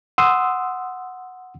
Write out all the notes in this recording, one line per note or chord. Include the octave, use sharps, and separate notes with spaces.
F#5 C6 D#6 E6